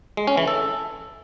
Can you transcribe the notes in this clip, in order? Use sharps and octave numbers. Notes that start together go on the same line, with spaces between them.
G#3
C#4
E3
A4